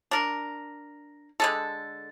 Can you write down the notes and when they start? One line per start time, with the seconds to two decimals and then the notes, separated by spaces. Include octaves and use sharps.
0.11 D4 A#4
1.40 D3 G#3 A4